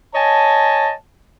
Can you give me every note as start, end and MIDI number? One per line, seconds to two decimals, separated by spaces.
0.15 0.92 73
0.15 0.92 75
0.15 0.92 80
0.15 0.92 81